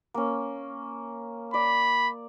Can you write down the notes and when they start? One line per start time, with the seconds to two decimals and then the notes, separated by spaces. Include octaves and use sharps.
0.14 A#3 C#4
1.54 D5 B5